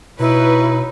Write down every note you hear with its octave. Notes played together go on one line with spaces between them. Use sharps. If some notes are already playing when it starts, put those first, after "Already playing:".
B2 D#4 E4 B4 C#5